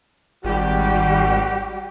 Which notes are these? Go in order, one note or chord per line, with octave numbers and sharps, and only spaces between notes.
G#1 G3 F#4 G4